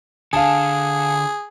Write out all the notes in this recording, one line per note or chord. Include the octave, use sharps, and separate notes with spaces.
D3 G#4 F5 G#5 A5